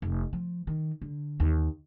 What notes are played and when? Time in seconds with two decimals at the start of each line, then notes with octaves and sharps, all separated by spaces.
0.02 F1
0.33 F3
0.67 D#3
1.02 D3
1.40 D#2